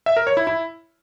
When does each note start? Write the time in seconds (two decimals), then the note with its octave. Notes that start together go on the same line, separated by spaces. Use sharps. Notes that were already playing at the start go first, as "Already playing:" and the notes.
0.06 E5
0.17 A#4
0.27 C#5
0.37 E4
0.47 E4